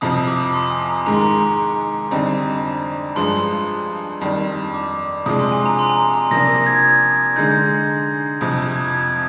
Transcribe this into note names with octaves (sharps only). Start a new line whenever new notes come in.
F2 C3 F3 D#6
D6
C6
G#5
A#5
G#2 D#3 G#3 A#5
C6
A#5
F2 D3 G3 C4 D#4
G2 F3 G#3 D4 C6
F2 D#3 G3 D4
D6
C3 F3 G#3 D4 D#6
C6
G#5
A#5
C6
G#5
A#5
C6
C3 F3 A#3 D4 A#6
G#6
D3 G#3 D#4 G6
F2 C3 F3 D#6
G#6
G#6